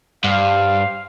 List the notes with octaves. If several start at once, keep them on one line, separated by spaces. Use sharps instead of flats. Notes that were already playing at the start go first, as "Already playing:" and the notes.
G2 G4 C5 F5